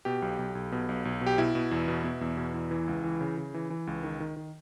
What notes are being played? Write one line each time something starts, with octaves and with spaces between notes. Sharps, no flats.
B2 G4
B1
B1
B1
B2
B1
B1
B2
G4
B2 E4
B2
E2
B2
B2
E2
B2
E2
E3
C#2
E3
C#3
C#3
E3
E3
C#2
D#3
D#3
D#3